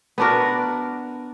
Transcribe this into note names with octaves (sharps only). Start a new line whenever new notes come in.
B3 D4 F#4 A#4